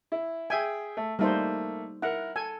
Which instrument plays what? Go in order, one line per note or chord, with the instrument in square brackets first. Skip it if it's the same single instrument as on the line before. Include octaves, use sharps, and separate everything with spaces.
[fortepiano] E4
[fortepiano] G#4 E5 G5 [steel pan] G#5
[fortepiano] A3
[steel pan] G3 D#4 C5 [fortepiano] A3 A#3
[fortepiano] E4 A#4 [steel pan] F#5
[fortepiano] A4 [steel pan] G#5